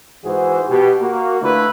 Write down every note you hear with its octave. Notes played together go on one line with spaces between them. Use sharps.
G#2 E3 F#4 G#4 C5
B2 G4
A#3 F#4
D3 A3 E4 F4 B4